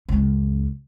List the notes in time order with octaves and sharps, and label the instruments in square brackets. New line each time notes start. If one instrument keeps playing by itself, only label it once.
[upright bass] C#2 F#2